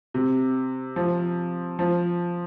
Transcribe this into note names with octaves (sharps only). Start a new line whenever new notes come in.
C3
F3
F3